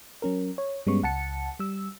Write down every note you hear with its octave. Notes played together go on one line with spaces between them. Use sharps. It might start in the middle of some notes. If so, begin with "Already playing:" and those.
F#3 C#4 A#4
C#5
G2 G3 G#3 B3 C#4 C#6
C#2 F#5 A5 C#7
G3 E6